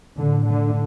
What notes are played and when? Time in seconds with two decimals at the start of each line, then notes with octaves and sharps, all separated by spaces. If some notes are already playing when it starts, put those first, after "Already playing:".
0.17 A2 D3
0.46 D3